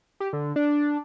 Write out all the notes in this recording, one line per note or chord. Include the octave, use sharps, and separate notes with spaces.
G4
D3
D4